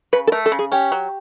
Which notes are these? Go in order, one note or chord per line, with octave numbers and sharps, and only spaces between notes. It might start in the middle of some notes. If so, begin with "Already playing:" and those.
C#3 B4
A4
A3 A#4
A4
C#3
G#4
C#4 G4
F#3